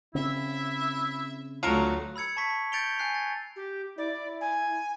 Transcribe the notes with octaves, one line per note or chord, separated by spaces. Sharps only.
C#3 C4 E4 E5
D2 F#3 A3 F4 A4 A#4
B5 E6 G#6 C#7
A5 C#6 B6
G6 A6 C#7 D7 F7 G7
G#5 F#6 C7
G#6 A6
G4
E4 D5
G#5